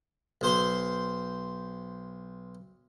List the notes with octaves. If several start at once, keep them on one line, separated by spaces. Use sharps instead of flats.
B1 C5 C6